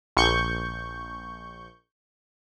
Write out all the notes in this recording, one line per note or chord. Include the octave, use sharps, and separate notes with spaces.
A#1 C#6 G6